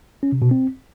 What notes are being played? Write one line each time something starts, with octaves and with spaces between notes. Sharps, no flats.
C#4
C3
B2
C4